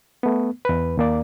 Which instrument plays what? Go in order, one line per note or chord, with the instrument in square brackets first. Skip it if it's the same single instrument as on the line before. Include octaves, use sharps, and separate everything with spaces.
[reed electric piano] A3 B3
E2 B4
D#2 A#3 D5